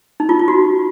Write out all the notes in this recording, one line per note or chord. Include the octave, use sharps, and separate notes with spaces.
D#4
F4
F4
F#4